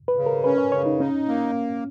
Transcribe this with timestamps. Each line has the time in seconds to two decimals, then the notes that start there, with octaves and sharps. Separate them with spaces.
0.08 B4
0.17 C#3
0.26 A#4
0.44 C#4 B4
0.58 C#5
0.72 C#3 C#5
0.86 D#4
1.00 C#4 D#4
1.28 A#3